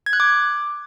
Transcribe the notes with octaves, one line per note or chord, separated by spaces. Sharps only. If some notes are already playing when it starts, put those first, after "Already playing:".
G#6
F#6
D6